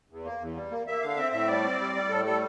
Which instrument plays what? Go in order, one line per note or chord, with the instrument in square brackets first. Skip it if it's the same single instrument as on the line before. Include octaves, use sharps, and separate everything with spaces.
[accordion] E2
A#3
E2
G3
A#3
A#3 E5
D3 F5
C4 E5
A2 E5
G3 D5
C4
G3
G3
A2 A4
G3 A4